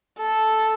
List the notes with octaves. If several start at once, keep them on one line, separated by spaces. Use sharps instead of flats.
A4